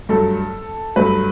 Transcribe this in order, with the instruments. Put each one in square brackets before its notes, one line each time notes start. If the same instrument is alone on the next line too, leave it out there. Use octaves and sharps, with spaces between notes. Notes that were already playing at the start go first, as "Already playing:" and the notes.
[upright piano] G2 F#3 A3 A4
G2 F#3 A3 B4